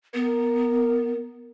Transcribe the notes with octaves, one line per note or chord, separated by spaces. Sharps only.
B3 A#4